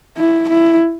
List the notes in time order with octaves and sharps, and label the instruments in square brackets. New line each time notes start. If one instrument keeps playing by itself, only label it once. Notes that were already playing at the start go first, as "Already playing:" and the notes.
[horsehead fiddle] E4
E4